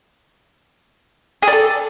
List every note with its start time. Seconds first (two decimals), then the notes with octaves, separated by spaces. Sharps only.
1.43 G#4
1.48 D5
1.53 A4